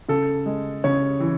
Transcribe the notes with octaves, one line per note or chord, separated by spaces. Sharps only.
C#3 A4
G#3
C#3 C#5
E3